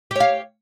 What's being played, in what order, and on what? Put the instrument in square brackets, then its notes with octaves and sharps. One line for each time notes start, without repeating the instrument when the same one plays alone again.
[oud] G4
C#5
F5